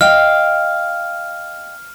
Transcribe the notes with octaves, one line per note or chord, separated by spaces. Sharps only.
D#5 F5 G5 F6